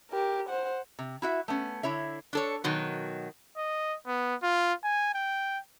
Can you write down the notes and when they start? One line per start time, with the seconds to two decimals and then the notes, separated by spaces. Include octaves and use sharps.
0.10 G4 A#4
0.49 C5 F#5
0.99 C3
1.22 E4 F#4 E5
1.48 A3 B3 C#4
1.83 D3 E4 C#5 E5
2.33 D4 A4 C#5
2.64 B2 D#3 F#3
3.57 D#5
4.07 B3
4.43 F4
4.84 G#5
5.14 G5